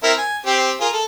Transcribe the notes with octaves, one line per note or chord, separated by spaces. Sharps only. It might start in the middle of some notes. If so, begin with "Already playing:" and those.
C4 E4 A#4
G#5
C4 G4
F4 G#4 A#4
A4